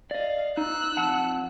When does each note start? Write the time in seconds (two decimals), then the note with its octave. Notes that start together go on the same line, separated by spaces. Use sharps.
0.11 D5 D#5 F5
0.57 D#4 E6 F#6
0.97 F2 F#5 A5